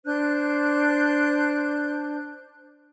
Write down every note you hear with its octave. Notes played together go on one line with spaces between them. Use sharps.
D4 C5 F#6 G6